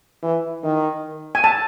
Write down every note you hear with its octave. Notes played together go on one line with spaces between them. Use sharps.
E3
D#3
G#5
A5